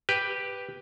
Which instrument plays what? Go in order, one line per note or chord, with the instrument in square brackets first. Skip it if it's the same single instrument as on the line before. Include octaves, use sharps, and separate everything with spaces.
[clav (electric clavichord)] G4 B4